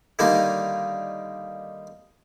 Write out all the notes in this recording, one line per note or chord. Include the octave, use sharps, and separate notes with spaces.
D3 D#3 G3 A#3 D#4